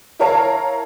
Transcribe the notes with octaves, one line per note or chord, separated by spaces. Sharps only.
E4 A#4 C#5 F5 A5